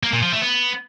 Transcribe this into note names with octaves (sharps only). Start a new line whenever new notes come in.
A#3
A#2
F3
A3
B3